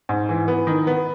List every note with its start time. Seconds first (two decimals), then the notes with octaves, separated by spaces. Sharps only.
0.09 G#2
0.29 E3
0.48 B3
0.67 D#3
0.87 B3